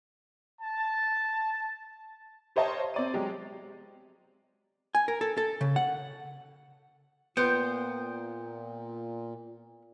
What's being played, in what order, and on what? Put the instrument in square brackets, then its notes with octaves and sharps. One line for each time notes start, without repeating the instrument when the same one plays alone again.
[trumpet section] A5
[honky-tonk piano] G4 C5 C#5 D#5 F5 A5
C4 D5 D#7
F#3 G#3 G4
[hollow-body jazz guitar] G#5
A#4
A4
A4
C#3
F#5
[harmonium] A#2 [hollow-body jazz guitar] B3 [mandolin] C5 G5